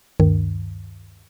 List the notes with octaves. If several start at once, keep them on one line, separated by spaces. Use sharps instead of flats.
D2 G2 D#3